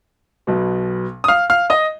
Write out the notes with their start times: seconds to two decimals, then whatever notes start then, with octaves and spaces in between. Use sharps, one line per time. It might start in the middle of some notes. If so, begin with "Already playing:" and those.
0.47 B1 B2 B3
1.24 D#6
1.28 F5 F6
1.50 F5 F6
1.70 D#5 D#6